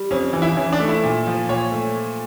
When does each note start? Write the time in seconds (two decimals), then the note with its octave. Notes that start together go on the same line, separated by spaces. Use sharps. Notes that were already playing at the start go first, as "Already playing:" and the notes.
Already playing: G3
0.11 F2 C#4
0.33 E3
0.42 E4
0.57 E3 C#4
0.73 D4
0.80 A3
0.88 E4
1.04 A#2
1.27 F3
1.49 A#2 C#5
1.72 A3